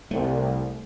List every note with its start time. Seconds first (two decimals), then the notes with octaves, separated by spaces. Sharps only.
0.11 C2 A3